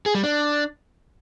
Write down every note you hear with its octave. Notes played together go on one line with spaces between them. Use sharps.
G#4
G3
D4